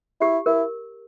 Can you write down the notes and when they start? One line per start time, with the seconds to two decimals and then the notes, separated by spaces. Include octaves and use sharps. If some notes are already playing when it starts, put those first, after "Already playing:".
0.21 E4 G4
0.46 E4 A#4